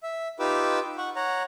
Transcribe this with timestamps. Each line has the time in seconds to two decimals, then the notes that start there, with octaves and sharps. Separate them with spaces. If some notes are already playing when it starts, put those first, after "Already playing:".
0.03 E5
0.40 D#4 F4 G4 B4 D6 E6
0.98 F#5 C#6
1.16 C#5 F#5 A#5